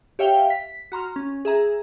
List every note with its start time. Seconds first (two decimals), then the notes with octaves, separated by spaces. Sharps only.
0.19 G4 C#5 E5 F5 G5
0.50 B6
0.92 F#4 A#5 C6 F6
1.16 C#4
1.45 G#4 E5 A#5